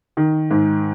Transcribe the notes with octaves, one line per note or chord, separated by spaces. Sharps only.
D#3
G#2